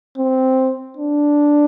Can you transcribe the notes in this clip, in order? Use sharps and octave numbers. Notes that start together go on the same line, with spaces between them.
C4
D4